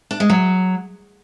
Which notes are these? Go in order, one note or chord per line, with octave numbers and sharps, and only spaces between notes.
D4
G#3
F#3